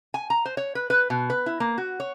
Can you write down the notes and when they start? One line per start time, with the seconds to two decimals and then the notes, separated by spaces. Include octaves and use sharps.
0.14 G#5
0.30 A#5
0.45 C5
0.57 C#5
0.75 B4
0.90 B4
1.10 B2
1.30 B4
1.46 E4
1.60 A#3
1.78 F#4
2.00 C#5